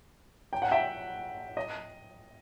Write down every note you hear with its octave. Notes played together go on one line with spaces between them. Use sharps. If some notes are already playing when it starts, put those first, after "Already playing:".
G5
F#5
E5 G5
D#5